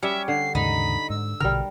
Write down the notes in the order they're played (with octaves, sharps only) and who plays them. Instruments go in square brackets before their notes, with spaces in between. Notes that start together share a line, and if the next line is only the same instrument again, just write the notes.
[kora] G3 [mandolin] C#4 G4 [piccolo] E5
[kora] D3 [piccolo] C7
[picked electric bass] D#2 G#2 C#3 [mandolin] D#4 [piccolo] B5
[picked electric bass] G#2 [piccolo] E6
[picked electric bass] A#1 B2 D3 [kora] G3 A#4 [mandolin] F6